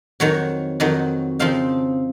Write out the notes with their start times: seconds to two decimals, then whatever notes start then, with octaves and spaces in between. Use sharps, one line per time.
0.20 F2 D#3 F#3 C#5
0.80 F2 D#3 F#3 D#5
1.39 C#3 F3 C4 D#4 F5